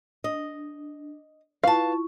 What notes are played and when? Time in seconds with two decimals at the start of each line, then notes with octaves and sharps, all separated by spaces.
0.24 D4 D#5
1.64 E4 F4 B4 F5 A5 C#6